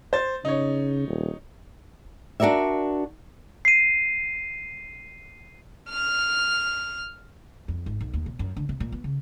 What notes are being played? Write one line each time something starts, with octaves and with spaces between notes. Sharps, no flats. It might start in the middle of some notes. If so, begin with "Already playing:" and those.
C5 A6
C#3 D#4 C#5
D#1
D4 F#4 A#4 D5 E5
C7 D#7
F6
F2
G#1
B1
D#2
B2
F#2
D3
C3
A#2
B3
C#3